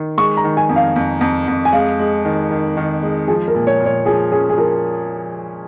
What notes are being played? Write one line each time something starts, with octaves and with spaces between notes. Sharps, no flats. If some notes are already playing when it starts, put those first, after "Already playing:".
Already playing: D#3
G#3 C#6
A#5
D#3
G#5
F2
F5
F2
F2
F2
G#5
G#3 F5
G#3
D#3
D#3
D#3
G#3
F3 G#4
A#4
A#2
C#5
A#2
C#5
F3 G#4
C#4 G#4
G#4
F3 A#4